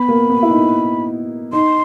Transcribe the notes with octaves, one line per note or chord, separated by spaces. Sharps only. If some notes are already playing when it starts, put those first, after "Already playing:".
Already playing: B3 B5
A#3
B3
E4
D#4
D#4 C6